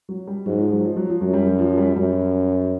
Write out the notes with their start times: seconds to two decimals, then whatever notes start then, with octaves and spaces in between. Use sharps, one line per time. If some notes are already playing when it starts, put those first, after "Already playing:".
0.09 F#3
0.27 G3
0.46 G#2 F#3
0.59 F3
0.72 F#3
0.84 F3
0.97 F#3
1.09 F3
1.21 F#2 F#3
1.33 G3
1.46 F#3
1.59 F3
1.77 G3
1.96 F#2 G3